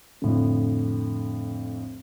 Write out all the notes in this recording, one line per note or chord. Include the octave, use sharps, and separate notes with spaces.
F2 A2 D3